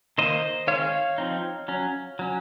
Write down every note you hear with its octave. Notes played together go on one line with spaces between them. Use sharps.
D#3 A#3 D#4 C5 D#5
D#3 G#3 C4 C#5 F5
F3 C4 D#4
F#3 C#4
F#3 C#4